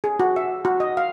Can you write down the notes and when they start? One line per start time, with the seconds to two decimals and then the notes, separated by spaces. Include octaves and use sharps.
0.04 G#4
0.20 F#4
0.36 E5
0.65 F#4
0.80 D#5
0.97 F5